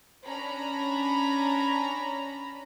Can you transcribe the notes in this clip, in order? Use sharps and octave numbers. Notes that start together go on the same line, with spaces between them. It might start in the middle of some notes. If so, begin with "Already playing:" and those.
C#4 D4 A#5 B5